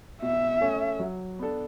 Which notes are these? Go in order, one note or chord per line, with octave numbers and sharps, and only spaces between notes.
B2 E5
A3 C#4
F#3
B3 D4 A4